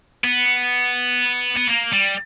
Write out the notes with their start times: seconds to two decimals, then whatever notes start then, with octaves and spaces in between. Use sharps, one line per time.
0.24 B3
1.57 B3
1.68 A#3
1.93 G3